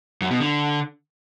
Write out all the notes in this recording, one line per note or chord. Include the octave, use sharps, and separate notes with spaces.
F#2
B2
D3